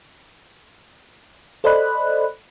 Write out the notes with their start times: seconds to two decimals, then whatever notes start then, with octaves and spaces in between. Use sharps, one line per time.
1.64 A4 C5 D5 D#5 B5 F#6